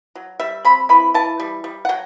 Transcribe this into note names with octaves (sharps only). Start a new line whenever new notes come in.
F#3
G3 E5
C4 B5
E3 B5
E3 A5
G3
G3
F#5
F#3 G5